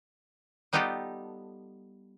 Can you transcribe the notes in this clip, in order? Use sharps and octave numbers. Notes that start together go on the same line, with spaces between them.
G3 B3 D#4 F4 G4 A4